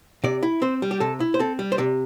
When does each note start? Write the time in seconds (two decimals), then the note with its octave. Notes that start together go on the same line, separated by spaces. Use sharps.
0.24 C3 D5
0.43 E4
0.62 C4 C5
0.82 G3
0.91 G4
1.00 C3 A4
1.20 E4
1.34 C5
1.39 C4 A4
1.59 G3
1.72 C5
1.78 C3 D5